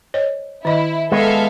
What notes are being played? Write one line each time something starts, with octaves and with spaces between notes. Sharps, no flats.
C5 C#5 D#5
D#3 E4 D#5
G#3 B3 A4 E5 F5